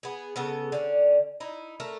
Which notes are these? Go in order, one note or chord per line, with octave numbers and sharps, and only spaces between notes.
B3 G#4
C#3 B3 A4
D3 C#4
D#4 E4
A3 A#4